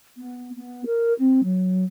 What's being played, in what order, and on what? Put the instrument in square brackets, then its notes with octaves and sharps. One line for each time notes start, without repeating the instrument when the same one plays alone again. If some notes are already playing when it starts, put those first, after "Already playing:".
[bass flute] B3
B3
A#4
C4
F#3